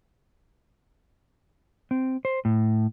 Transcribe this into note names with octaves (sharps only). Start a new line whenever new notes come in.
C4
C5
A2